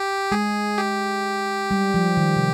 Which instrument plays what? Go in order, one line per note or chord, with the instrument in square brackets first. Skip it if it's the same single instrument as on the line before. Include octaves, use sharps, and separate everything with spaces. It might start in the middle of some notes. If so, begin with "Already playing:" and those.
Already playing: [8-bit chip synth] G4
[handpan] G#3 [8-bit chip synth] G#4
[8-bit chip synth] G4
[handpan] G3
F3
D#3
C3